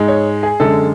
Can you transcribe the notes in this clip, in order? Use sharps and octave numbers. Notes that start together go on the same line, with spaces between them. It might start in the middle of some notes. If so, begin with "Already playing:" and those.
Already playing: G#2 G#3
C#5
G#4
F#2 D3 G#3 A4